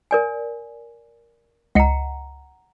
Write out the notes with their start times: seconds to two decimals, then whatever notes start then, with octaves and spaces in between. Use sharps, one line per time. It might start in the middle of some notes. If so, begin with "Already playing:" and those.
0.11 A#4 D5 G#5
1.75 C#2 D#5 F#5 A#5 C#7